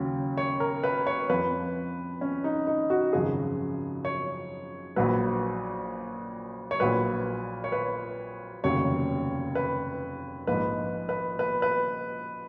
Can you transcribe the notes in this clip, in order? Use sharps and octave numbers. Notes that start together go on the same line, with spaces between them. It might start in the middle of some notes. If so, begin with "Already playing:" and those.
Already playing: D#2 C#3 F#3
C#5
A#4
B4
C#5
F2 F3 B4
C#4
D#4
D#4
F#4
G#1 F#2 C#3 F3 G#4
C#5
A#1 A#2 F#3 B4
C#5
A#1 A#2 F#3 B4
C#5
B4
F1 D#2 C#3 F#3 C#5
B4
A#1 G#2 F3 B4
B4
B4
B4